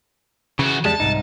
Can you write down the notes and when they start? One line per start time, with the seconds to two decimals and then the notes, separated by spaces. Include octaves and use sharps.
0.59 C#3 E3 F#4
0.85 E2 G3 G#3 A5
1.00 C2 G#2 D#4